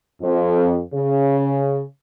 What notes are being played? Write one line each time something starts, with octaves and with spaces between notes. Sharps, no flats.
F2
C#3